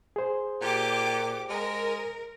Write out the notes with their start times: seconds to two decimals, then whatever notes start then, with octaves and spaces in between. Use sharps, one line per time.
0.16 G#4 C5
0.62 A#2 G4 D6
1.50 G#3 A#4